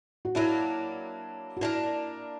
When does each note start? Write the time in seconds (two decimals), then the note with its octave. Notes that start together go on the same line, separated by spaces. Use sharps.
0.25 F#4
0.35 F#3 A#3 D4 E4
1.57 F#4
1.61 A#3 D4 E4 A#4